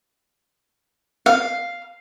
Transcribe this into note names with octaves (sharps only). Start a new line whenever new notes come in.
F5